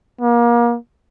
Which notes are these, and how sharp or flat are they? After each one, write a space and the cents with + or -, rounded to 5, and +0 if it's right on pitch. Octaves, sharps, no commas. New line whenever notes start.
A#3 +30